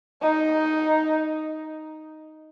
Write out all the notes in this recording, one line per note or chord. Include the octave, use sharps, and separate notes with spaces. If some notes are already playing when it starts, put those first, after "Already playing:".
D#4